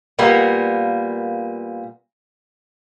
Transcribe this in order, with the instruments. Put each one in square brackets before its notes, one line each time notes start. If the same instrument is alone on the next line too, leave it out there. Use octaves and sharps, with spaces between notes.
[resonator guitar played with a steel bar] A#2 G3 A#3 B3